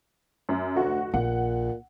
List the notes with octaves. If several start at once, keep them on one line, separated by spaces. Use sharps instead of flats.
F#2
F1 D2 F#4
A#1 A#2 F#5